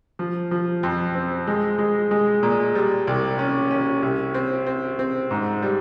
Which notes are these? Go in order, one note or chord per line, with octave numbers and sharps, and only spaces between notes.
F3
F3
F2
C4
G#3
G#3
G#3
A#2
G3
C2
C#4
C#4
C2
C4
C4
C4
G#2
G3